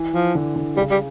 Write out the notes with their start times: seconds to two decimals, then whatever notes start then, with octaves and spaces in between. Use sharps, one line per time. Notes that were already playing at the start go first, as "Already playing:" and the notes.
Already playing: E3
0.14 F3
0.35 D3
0.56 D3
0.76 C#3 G3
0.91 G3